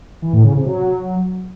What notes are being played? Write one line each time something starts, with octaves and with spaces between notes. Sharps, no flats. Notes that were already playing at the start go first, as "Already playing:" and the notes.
E3
A2
C#3
C3
F#3